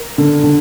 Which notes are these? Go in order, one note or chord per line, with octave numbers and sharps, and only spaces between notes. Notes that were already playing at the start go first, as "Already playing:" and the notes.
Already playing: A#4
D3
D3